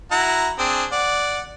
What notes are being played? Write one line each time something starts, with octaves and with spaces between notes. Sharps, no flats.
E4 F#4 A#5
C4 D4 G#4
D5 F#5